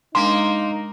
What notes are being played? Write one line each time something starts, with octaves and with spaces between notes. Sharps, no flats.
G#3 A#3 D4 D#4 C6